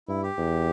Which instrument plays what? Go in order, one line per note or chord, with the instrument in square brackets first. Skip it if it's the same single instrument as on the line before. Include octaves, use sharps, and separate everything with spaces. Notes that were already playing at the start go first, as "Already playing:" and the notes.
[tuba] G2 [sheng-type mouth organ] E4
[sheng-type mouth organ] G4
[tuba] E2